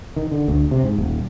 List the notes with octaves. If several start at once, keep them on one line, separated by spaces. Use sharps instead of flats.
D#3
D3
D2
C3
G#2
D#1